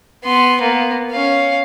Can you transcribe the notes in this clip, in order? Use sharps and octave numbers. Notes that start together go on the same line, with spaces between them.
B3 C6
A#3 B3
C#4 F5